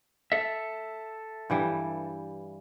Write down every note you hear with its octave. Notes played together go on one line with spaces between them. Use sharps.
A4 E5
G2 E3 G3